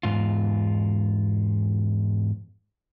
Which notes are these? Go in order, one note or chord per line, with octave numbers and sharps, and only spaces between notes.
E2 G#2 F4